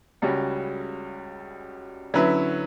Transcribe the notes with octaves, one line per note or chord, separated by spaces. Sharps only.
C#2 C#3 G3 C#4 F#4
D3 F#3 C#4 E4 B4